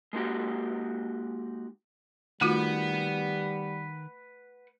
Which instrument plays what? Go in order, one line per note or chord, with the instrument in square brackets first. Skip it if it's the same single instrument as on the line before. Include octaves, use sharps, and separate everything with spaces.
[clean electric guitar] G#3 A#3 D#4 F#4 G4
[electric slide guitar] D#3 [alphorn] G3 [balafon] A3 F4 F#4 [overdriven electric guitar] B4 F#5